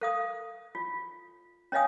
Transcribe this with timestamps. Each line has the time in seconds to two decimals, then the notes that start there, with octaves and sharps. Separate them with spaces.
0.01 A4 F5 D#6
0.75 F4
1.72 C#4 C#5 D#5 F5 G#5 D#6